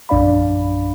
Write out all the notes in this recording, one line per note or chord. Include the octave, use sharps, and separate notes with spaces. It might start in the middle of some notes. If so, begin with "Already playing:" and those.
A#1 F#2 D4 D5 F5 B5